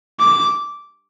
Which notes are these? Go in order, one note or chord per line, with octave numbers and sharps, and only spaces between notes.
D6